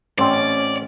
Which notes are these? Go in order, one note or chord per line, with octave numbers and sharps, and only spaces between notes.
A1 C4 C#4 C5 D5